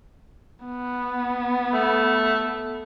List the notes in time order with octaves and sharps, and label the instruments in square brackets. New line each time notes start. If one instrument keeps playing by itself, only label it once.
[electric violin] B3
[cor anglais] A3